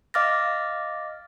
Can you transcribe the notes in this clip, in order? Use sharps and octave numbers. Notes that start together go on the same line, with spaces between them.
D#5 F5 D6 F6 A6 A#6